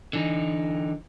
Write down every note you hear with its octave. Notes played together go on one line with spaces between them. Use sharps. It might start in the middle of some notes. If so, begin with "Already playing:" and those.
D3 E3 D#4